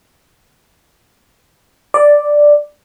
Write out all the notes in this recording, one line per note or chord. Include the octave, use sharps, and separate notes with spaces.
D5